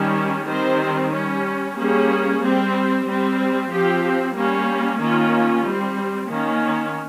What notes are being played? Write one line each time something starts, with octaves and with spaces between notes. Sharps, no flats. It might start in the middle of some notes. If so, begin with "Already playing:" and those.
Already playing: D#3 G3 C#4
D#3 G3 C4 C5
G3 C#4
G3 A#3 C#4 G#4
G3 C4
G3 C4
F3 C4 G4
G3 A#3 C#4
D#3 A#3 C#4 F4
G3 C4
D#3 A#3 C#4